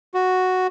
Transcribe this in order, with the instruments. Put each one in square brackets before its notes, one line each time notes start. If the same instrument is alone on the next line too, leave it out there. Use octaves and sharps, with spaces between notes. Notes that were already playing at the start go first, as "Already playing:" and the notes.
[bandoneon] F#4